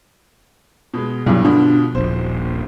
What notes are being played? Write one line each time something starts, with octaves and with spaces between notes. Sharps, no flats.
B2 G#3
E2 G2 B2 E3 F#3
B2 D3 F3 D4
D#1 A#1 C5